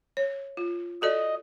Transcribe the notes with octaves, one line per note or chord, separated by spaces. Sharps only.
C#5
F4
F#4 A4 D5 D#5